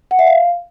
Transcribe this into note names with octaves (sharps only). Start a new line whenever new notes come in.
F#5
E5
F5